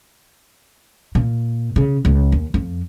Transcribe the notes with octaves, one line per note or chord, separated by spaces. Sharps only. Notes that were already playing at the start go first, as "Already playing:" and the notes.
A#2
C#3
C#2
D#2
F2